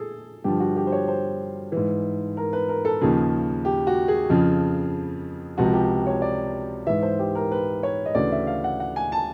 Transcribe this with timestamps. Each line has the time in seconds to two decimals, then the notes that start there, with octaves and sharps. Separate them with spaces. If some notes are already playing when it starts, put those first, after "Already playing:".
Already playing: G#4 A4
0.44 G2 D3 F3 G4
0.60 F#4
0.77 G4
0.87 C5
0.92 C#5
1.08 C5
1.72 G#2 E3
2.37 A#4
2.53 B4
2.69 A#4
2.85 A4
3.01 D#2 C#3 F3 G#4
3.65 G4
3.87 F#4
4.08 G#4
4.29 F2 C#3 F3
5.58 C#2 C3 F3 F#4
5.74 G4
6.07 C#5
6.22 D5
6.87 G#2 E3 E5
7.03 C5
7.19 G4
7.35 A#4
7.52 B4
7.83 C#5
8.06 D#5
8.15 D2 C#3 E3 D5
8.32 E5
8.47 F5
8.64 F#5
8.80 F#5
8.96 G#5
9.12 A5